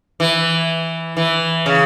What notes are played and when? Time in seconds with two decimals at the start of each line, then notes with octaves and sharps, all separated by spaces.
0.20 E3
1.17 E3
1.66 C#3